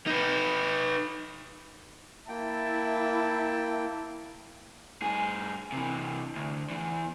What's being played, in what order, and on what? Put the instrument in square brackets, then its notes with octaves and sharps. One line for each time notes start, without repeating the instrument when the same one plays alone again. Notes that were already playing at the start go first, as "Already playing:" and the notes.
[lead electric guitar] D#4 B4
[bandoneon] A#3 G5 [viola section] E4 [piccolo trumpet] A5
[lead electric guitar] G2 G#4
C3 E3
D2
E2 E3